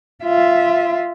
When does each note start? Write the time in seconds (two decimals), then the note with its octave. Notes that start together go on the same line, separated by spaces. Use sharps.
0.24 F4 E5